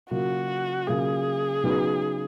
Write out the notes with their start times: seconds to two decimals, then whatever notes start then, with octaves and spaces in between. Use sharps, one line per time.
0.11 C#3 F#3 A#3 F4 F#4
0.87 C#3 F#3 A#3 F4 G#4
1.64 C#3 F#3 B3 D#4 F#4